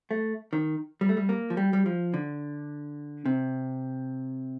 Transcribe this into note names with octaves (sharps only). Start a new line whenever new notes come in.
A3
D#3
G3
A3
G3
A#3
F3
G3
G3
F3
D3
C3